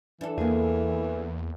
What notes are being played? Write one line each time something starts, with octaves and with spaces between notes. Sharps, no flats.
E3 D4 A4
E2 A#3 G#4